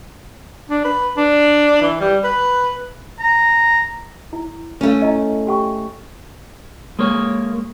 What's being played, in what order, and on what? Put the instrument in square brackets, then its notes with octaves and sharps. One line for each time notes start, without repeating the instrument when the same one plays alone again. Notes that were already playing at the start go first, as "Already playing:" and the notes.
[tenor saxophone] D4
B4
D4
E3
G3
B4
[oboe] A#5
[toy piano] E4
[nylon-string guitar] A3 C#4
[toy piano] E4 D#5
G4 G5 C#6
[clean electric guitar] G#3 A#3 C#5